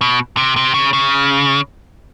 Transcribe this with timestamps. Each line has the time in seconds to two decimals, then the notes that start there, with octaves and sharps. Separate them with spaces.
0.01 B2
0.37 C3
0.56 C3
0.74 C#3
0.93 C#3